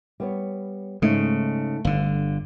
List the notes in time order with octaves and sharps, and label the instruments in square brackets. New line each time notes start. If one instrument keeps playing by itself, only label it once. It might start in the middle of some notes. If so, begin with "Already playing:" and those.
[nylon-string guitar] G3 B3 C#5
[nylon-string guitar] G#2 A3 D#4 [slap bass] C#3
[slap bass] G1 D3 [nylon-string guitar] F5